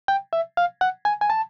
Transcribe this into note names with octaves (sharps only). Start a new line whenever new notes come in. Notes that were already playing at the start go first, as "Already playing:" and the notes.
G5
E5
F5
F#5
G#5
G#5
A5